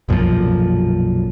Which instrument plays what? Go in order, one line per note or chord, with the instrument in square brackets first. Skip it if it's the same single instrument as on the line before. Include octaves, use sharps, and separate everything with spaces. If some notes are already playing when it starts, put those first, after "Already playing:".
[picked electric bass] B1 F#2 A#2 F3